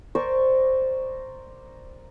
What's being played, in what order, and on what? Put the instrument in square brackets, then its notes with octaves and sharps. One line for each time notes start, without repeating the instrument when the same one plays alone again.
[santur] A#4 C5 D5 C#6